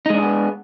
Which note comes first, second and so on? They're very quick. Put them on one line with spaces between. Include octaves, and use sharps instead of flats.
D#4 G#3 D4 G#4 B3